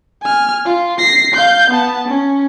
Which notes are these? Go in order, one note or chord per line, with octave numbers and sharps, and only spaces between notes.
G#5 F6
F4
A#6 C7
F5 G6
B3 A5
C#4